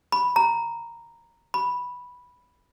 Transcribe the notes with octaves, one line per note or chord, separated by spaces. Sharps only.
B5
A#5
B5